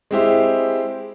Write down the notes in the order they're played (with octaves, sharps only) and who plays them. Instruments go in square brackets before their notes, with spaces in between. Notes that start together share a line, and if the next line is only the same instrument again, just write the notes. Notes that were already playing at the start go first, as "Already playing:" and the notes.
[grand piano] G#3 C4 E4 G4 C5 E5